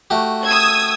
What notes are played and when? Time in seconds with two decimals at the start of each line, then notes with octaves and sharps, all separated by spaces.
0.10 A3 F#4 G4
0.45 D#6 E6 G#6